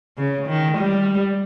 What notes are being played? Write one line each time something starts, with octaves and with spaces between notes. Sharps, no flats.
C#3
D#3
G3